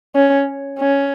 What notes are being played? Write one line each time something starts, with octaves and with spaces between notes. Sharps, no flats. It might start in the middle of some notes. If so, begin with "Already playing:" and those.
C#4
C#4